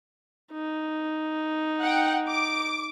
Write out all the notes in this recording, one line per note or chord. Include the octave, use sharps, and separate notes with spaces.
D#4
F#5 G5
D6